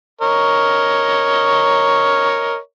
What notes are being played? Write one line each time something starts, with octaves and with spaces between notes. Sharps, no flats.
A#4 C#5 D#5